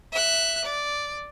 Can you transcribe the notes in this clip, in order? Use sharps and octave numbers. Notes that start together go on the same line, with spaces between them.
E5 F#6
D5